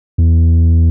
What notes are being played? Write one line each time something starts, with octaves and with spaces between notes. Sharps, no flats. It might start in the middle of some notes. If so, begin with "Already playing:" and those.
E2